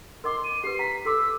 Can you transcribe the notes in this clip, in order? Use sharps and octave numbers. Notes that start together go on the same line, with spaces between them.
A#4 D#5 C6 D6
D#7
G4 B4 C7
A#5 B6
A4 C6 D6 E6